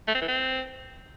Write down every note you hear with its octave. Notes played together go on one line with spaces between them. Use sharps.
A3
C4
E3
C4